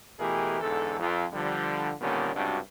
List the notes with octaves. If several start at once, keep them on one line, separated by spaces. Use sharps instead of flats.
B2 E3 A3 G4 G#4 A#4
E2 G#2 D3 A4
F2
D3 F3 G3
A#2 D3 D#3 G3 B3 C#4
C#2 G2 C3 D4 F#4